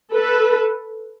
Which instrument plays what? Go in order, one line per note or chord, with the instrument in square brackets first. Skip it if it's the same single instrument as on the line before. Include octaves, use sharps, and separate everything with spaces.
[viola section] A4 B4